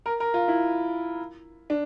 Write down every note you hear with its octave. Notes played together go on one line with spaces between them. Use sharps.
A#4
A#4
F4
E4
D4